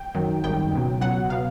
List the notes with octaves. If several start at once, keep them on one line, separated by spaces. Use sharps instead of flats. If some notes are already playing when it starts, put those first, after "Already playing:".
Already playing: G5
F#2 D#3 F#3
G#1 F#2 D#3 G3 G5
C#2 B2 F#3
C#2 B2 F#3 F#5
B2 F#3 F5